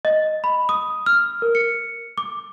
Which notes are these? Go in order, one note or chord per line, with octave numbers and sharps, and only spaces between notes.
D#5
B5
D#6
F6
A#4
C#7
D6